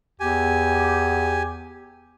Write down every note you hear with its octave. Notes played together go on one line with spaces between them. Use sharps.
E2 G4 G#5